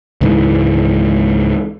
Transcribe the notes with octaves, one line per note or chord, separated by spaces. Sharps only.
C#2 G#2 E3